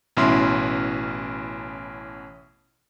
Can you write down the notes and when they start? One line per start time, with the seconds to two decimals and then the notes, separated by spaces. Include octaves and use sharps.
0.17 A1 B2 C#4 E4 C6